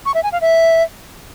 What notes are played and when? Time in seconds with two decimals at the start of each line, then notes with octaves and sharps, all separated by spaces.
0.05 C#6
0.14 E5
0.23 G#5
0.32 F5
0.41 E5